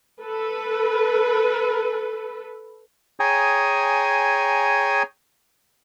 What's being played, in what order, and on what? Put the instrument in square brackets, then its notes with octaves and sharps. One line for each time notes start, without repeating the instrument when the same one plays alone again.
[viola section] A4 B4
[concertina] G#4 C#5 G5 G#5 A#5 D#6